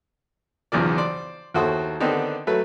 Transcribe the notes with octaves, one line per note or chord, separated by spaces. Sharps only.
B1 E2 C#3 F3 D5
C5 D5
D#2 E4 F#4 A4 C5 D#6
D3 D#3 B3 C4 D4 D#4
F#3 A3 A4 B4